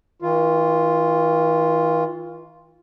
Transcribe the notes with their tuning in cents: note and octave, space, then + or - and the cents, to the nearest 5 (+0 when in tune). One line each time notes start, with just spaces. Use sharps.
E3 -45 F4 +0